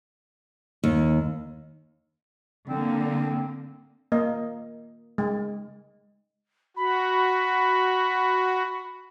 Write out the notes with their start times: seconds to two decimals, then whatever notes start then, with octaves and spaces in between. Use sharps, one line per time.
0.84 D#2
2.69 D3 A#3 C4
4.12 A#3 D#5
5.18 G#3
6.77 F#4 B5